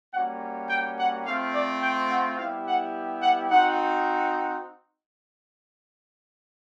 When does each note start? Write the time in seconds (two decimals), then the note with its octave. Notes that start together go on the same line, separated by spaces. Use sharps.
0.13 G3 A#3 C#4 F#4 F#5
0.69 G5
0.97 F#5
1.25 A3 C4 F4 F5
1.53 D5
1.81 G5
2.09 F#5
2.37 G3 B3 E4 G4 F5
2.66 F#5
3.21 F#5
3.49 C4 D#4 F#4 F#5